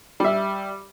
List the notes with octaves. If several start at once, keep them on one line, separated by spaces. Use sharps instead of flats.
G3 E5